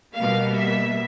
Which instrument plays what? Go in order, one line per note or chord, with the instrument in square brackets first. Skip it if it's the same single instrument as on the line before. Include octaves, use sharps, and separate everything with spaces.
[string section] B2 G3 A#3 F5
E5